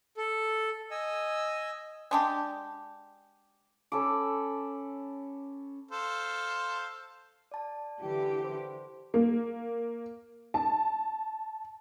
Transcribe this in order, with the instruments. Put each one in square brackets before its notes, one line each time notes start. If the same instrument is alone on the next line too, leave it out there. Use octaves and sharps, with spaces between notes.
[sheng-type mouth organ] A4
D#5 G#5 E6
[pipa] G#3 D4 G4
[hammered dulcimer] C#4 A4 B5 D6
[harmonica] A4 C5 F5
[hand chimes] D5 A5
[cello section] D3 E3 G4
[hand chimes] C5
[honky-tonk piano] A#3
A5